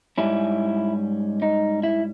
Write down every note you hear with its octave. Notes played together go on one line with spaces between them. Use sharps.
G#2 G3 C#4 E4
D#4
E4